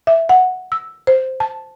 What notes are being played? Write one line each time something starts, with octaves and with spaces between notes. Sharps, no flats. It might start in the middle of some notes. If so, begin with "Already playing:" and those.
E5
F#5
E6
C5
A5